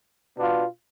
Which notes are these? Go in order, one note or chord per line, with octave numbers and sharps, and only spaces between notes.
B2 B3 D4 F4